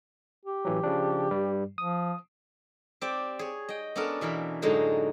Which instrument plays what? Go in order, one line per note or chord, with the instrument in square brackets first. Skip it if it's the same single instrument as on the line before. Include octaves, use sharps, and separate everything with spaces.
[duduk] G4
[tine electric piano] A1 E3 F#3
C#3 F3 D4
G2 G3
[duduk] F3 [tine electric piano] D#6
[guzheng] C4 G4 D5
G#4 C#5
D#5 G5
B3 C#4 D4 A4 A#4
B2 E3 A#4 B5
F#2 A2 D3 G#3 D#4 F#4